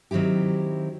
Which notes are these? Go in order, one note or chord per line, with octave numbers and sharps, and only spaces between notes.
D#3 F#3 C4 E4 G4